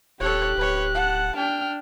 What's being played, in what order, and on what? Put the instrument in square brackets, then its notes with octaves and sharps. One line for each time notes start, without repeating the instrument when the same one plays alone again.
[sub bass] D#1 [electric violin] G4 F#6 [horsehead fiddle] A4 C#5
[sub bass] D1 [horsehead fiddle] B4 C#5
[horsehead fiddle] F#5 A5
[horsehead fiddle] D4 [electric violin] G5 F6